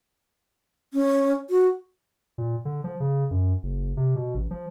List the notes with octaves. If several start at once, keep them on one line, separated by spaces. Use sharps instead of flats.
C#4
F#4
A#2
D3
F3
C#3
F#2
F#1
C3
B2
A1
F3